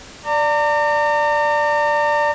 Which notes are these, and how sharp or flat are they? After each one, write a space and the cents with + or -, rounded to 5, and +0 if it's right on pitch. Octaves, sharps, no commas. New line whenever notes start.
D5 +0 A#5 -40